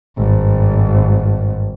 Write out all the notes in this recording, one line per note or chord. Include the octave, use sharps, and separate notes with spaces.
G#1 G2